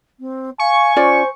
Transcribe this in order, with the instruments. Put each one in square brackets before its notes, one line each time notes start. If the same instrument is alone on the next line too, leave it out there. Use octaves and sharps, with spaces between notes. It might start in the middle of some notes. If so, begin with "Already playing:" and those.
[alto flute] C4
[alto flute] F5 [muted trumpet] G#5 [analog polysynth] C#6
[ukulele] C#4 F4 D5 [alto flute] C5